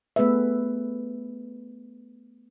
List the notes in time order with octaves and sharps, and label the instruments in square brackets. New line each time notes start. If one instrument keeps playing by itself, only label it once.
[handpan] A3 B3 G#4 B4 E5